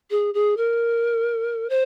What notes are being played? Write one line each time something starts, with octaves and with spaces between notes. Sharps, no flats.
G#4
G#4
A#4
C5